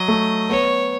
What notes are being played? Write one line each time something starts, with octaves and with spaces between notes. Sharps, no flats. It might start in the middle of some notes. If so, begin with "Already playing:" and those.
Already playing: F#3 D#5
A3
B3 C#5